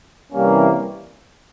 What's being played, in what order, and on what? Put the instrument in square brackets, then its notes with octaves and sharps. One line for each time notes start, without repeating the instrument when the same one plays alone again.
[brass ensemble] C3 E3 G3 A#3 C#4